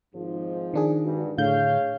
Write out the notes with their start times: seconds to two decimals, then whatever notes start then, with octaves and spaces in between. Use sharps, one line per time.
0.14 G#1 G#2 F3
0.74 D#3 D4 G#4
1.04 G#1 G2 F#4
1.38 A2 D3 G#4 C#5 F5 G6